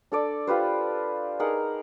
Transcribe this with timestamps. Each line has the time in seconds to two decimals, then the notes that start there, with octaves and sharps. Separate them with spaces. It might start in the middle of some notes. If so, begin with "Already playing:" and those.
0.12 D4 A4 D5
0.47 F4 G4 B4 C5
1.39 D#4 G#4 A#4 F#5